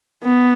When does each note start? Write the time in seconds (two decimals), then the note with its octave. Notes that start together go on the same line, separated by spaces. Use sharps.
0.24 B3